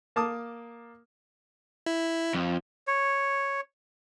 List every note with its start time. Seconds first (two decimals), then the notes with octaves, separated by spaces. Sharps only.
0.16 A#3 A5 D6 D#6
1.86 E4
2.35 F2
2.87 C#5